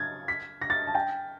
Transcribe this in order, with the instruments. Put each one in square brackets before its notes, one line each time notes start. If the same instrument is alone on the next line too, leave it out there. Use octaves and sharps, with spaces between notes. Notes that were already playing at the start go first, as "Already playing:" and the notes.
Already playing: [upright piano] G#6 A6
B6
A#6
A6
A5
G5